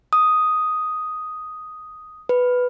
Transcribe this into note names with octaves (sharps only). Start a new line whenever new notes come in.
D#6
B4